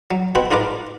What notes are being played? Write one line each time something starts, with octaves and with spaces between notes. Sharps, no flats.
F#3
B2 C4 F#4 B4 B5
G#2 D4 F4 A#4 B4 D6